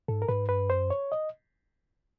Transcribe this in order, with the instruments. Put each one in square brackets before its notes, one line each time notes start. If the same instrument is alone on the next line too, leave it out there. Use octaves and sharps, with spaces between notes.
[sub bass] G#2 [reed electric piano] A4
[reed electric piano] A#4
[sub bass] G#2 [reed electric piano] B4
[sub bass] G2 [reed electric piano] B4
[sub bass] F#2 [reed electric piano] C5
[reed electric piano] C#5
D#5